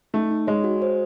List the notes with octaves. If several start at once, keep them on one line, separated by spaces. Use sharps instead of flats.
A3 D#4
D#4
G#3 C#5
F#4
C5